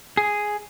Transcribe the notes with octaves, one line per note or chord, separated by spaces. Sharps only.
G#4